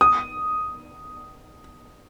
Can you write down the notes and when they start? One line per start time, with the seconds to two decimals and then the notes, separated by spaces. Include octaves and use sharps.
0.01 D#6